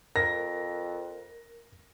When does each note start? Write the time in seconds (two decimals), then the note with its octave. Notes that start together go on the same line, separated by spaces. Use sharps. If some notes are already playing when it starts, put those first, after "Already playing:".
0.16 F2 A#4 A#6